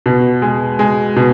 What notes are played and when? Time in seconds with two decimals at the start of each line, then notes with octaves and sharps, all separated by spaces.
0.06 B2
0.42 G#3
0.79 G#3
1.16 B2